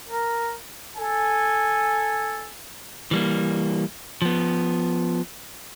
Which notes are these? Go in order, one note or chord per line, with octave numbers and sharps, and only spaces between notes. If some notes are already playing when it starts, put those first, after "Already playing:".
A#4
A4 G#5
E3 G3 A#3
F3 B3